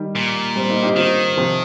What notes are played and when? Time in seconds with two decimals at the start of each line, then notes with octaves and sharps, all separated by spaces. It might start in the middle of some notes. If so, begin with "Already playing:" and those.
Already playing: D#3 G3
0.15 A#2
0.56 G3 C4
0.70 A#3 D#4
0.83 D#4 G4
0.96 D#3 C4 F4
1.37 C3 F3